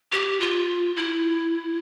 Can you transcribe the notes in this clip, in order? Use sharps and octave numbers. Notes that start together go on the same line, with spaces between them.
G4
F4
E4